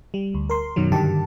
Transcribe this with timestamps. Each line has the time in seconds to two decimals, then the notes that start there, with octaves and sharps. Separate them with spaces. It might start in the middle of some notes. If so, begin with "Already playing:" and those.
0.14 G3
0.34 D2
0.49 A#4 C6
0.76 F#2 B2 D#3 F#3
0.92 G2 D3 D#3 G4 A5